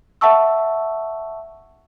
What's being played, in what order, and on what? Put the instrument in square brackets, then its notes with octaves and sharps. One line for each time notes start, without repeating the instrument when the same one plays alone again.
[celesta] E5 F#5 A5 C#6 E6